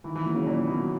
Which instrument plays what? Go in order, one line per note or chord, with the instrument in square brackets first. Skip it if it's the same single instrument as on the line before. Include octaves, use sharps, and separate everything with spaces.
[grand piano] D#3 [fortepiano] E3
[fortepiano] E3
[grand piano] F#3 A#3
[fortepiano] C#3
[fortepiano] A#2 [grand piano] D#3
[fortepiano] B2 [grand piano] F#3 A#3